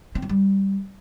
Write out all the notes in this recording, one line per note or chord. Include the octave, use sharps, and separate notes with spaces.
C4
F3
G3